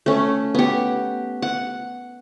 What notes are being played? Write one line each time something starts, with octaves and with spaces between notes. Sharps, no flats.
A3 C#4
B3 G4
F#5